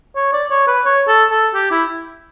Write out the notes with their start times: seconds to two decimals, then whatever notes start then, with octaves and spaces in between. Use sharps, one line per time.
0.16 C#5
0.33 D5
0.51 C#5
0.67 B4
0.85 C#5
1.08 A4
1.31 A4
1.55 G4
1.71 E4